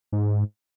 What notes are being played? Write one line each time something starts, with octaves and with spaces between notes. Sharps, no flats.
G#2